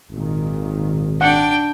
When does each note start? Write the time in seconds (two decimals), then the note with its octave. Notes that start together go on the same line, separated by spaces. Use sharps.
0.10 G#1 A#2 D#3
1.21 D4 F#5 G5